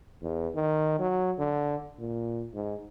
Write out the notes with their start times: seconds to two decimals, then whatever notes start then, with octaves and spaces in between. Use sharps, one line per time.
0.22 E2
0.55 D#3
0.99 F#3
1.38 D3
1.99 A#2
2.54 G#2